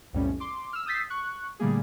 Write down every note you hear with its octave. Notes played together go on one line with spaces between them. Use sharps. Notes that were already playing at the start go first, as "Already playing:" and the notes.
B1 F2 A2 G3 C#4
C6 D6
E6 F6
D#6 E6 G6 A6 B6 C7
C#6 F#6
A#2 D3 G3 A3 A#3 G#4